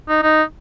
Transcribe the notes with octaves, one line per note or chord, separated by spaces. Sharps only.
D#4
D#4